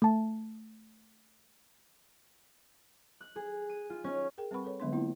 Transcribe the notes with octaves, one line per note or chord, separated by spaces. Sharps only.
A3 A5
F#6
G#4
D#7
F4
C#4
G#4 A#4 G5
G3 C4 B4 F#5 B5 C#6
A4 B4 C#5
D3 F#3 G#3 B3 D4 C6
A#3 C4 E4 F4